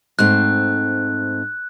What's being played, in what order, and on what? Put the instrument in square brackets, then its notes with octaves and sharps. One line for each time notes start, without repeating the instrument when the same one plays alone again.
[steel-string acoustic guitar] G#2 A3 C4 [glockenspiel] F#6